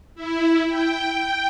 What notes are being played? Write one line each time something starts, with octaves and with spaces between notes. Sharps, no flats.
E4
G5